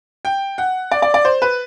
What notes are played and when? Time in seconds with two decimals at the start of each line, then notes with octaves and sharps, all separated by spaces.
0.25 G5
0.58 F#5
0.91 D5
1.02 D5
1.14 D5
1.25 C5
1.42 B4